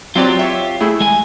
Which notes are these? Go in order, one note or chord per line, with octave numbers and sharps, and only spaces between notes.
F#3 C4 F4 G4 D5
C#5 E5
A3 E4 G#4
G#3 G#5